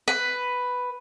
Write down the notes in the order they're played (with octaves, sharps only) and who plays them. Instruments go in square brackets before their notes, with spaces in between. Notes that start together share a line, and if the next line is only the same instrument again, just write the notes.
[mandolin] B4